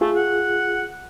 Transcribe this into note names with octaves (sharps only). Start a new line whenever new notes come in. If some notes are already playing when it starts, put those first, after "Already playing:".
A3 F4 G#4
F#5